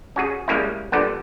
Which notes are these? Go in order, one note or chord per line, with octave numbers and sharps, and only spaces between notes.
C#4 F#4 G#4
G3 G#3 A#3 C#4 E4
A#2 D3 G3 B3